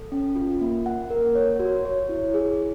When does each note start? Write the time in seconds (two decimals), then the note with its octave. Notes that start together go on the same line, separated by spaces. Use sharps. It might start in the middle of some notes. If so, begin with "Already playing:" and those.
Already playing: A4
0.12 C#4
0.36 F4
0.61 A#3
0.86 F#5
1.10 A#4
1.35 C#5
1.60 F#4
1.85 C#5
2.09 E4
2.34 G#4